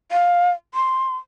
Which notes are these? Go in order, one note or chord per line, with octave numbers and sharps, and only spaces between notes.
F5
C6